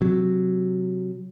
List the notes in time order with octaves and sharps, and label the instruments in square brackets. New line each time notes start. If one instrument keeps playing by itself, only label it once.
[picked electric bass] C3 F#3